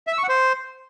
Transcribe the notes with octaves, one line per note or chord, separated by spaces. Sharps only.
E5
E6
C#6
F#5
C5